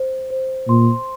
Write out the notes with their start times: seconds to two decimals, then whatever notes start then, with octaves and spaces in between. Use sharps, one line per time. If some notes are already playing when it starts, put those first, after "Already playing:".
Already playing: C5
0.30 C5
0.68 A#2 C6